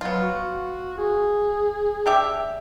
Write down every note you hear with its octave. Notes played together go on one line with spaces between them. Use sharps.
F#3 B3 F4
F#4
G#4
D4 G4 E5